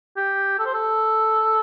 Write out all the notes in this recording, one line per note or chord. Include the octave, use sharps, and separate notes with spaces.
G4
A4
C5
A4